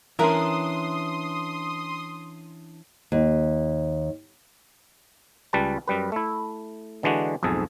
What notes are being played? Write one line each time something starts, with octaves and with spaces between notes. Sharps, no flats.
E3 C#4 D4 A#4 E5 C6 D#6
D#2
C#2 G3 B4 A5
F#2 G3 B4
A3 E4
D3 E3 G#3 D4 F#4
B1 F2 G#2 G#4 A4